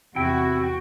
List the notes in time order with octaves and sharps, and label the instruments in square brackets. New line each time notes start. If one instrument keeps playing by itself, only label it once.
[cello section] E2 F#4 [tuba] C3 [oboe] E4 [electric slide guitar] G5